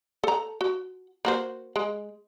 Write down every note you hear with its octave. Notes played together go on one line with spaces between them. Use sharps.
A4 A#5
F#4
A#3 F#4 C5
G#3